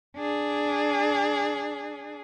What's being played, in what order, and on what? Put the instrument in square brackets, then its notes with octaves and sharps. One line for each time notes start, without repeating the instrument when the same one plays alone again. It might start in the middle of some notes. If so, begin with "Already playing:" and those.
[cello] D4 G#4